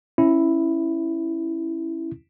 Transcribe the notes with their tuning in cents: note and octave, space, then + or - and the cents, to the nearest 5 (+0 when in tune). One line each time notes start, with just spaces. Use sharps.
C#4 -10 E4 +0